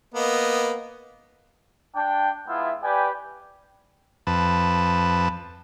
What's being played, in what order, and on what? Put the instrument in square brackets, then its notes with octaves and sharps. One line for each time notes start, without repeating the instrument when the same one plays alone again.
[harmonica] A#3 B3 D#5
[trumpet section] D4 G5
G#3 B3 E4 F4 E5
G4 B4 D5 G5 G#5
[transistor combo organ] F2 B4 A5